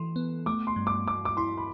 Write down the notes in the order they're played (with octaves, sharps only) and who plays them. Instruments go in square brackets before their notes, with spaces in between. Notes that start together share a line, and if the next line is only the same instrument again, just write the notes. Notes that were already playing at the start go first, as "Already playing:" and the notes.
Already playing: [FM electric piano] E3 A4 [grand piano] C6
[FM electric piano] B3
[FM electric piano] A3 [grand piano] D6
[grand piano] C6
[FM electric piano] G2
[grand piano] D6
[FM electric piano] G2 [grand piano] D6
[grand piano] D6
[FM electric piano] E4 [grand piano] C6
[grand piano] B5